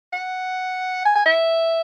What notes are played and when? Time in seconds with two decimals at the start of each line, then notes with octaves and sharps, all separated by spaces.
0.13 F#5
1.05 G#5
1.16 G#5
1.25 E5